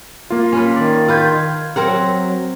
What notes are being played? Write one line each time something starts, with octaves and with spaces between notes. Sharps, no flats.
A#3 F4
C#4 B4
D#3 D5
F4 B4 F6 G6 G#6
F#3 C4 A#4 F#5